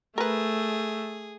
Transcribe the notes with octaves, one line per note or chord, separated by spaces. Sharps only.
A3 G#4 A#4 B4